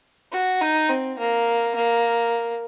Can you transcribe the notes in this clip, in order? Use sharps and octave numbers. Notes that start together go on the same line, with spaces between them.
F#4
D#4
C4
A#3
A#3